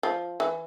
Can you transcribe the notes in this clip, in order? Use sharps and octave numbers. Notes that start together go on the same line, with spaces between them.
F3
E3